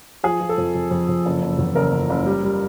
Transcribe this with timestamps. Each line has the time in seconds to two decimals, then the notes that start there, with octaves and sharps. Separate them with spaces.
0.24 F3 G#4
0.41 F3
0.49 A4
0.58 F2
0.75 F2
0.91 F2
1.09 F2
1.25 F#1
1.42 F#1
1.59 E2
1.75 F#1 A#4
1.92 F#1
2.10 F#1
2.26 G3
2.43 G3